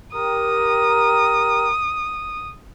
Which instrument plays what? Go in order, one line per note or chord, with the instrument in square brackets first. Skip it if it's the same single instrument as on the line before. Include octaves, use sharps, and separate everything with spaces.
[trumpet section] G4 A#4 [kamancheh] D#6